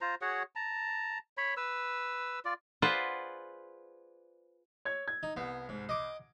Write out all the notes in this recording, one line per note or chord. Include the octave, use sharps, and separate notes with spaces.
F4 C5 A#5
F#4 G#4 C#5 F#5
A5 A#5
C#5 B5
B4 E6
F4 D5
F4 G#4 B4 C5 D5 F#5
C#5 G#6
G#6
D#4
C2 B3
G#2
D#5 D6